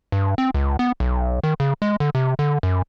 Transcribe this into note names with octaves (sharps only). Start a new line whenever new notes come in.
G2
C4
C#2
B3
B1
D#3
C#3
G#3
D3
C3
D3
F#2